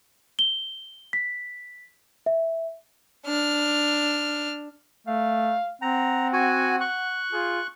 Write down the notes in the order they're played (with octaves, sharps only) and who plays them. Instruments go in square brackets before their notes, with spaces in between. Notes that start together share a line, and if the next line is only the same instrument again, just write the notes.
[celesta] G7
B6
E5
[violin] D4 F6
[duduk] A3 [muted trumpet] F5
[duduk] C4 [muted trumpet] F#5 [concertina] A#5
[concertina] F#4 G#5
C#6 F#6
[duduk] F4 [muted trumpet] G#4